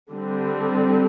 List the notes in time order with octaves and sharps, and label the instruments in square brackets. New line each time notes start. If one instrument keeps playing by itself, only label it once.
[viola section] D3 G3 C4